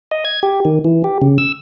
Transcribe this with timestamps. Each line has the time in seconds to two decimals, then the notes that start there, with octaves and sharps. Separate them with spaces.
0.11 D#5
0.25 G#6
0.43 G4
0.65 D#3
0.85 E3
1.04 G4
1.22 C#3
1.38 E6